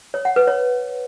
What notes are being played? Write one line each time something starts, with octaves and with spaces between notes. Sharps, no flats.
C#5
F#5
B4
C#5